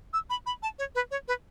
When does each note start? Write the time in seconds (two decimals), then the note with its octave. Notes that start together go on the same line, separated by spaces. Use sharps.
0.13 E6
0.30 B5
0.46 B5
0.63 A5
0.79 C#5
0.95 B4
1.11 C#5
1.28 B4